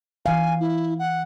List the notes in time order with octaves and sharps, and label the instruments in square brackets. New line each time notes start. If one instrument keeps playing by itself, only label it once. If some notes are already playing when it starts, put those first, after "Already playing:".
[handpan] E3 F5 [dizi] G#5
[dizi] E4
F#5